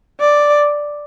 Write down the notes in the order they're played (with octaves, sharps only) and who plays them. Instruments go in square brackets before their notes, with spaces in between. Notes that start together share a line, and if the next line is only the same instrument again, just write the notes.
[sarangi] D5